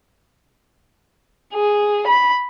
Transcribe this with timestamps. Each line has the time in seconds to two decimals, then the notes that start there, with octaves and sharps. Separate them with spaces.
1.55 G#4
2.07 B5